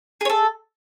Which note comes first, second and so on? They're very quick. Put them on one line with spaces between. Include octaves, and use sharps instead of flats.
G#4 C#5 A4